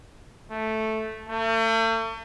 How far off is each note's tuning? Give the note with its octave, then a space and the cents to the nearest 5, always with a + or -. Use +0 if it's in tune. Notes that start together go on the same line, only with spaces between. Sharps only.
A3 -5
A3 +40